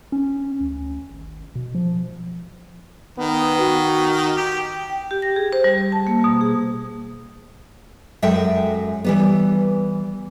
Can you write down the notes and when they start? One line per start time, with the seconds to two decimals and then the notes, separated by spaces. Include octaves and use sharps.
0.12 C#4
0.61 D2
1.11 G#1
1.55 B2
1.75 F3
3.18 D#3 B3
3.59 F#4
4.36 G4
4.90 G5
5.11 G4
5.22 A#6
5.36 G#4
5.53 C5
5.64 G3
5.92 A5
6.07 A#3
6.24 B2
6.41 G#4
8.22 F#2 G#3 A4 E5 G5
9.04 E3 G3 B3